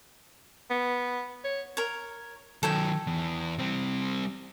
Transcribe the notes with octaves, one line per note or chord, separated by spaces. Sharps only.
B3
C#5
A#4 C#5
D#3 F#3 A4 C#5 G5
E2
G3 C4